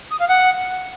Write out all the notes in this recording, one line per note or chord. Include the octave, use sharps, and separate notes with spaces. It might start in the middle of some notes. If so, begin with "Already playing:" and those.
D#6
F5
F#5